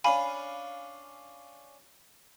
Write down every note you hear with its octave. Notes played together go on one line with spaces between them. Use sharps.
C#4 D4 F5 G#5 B5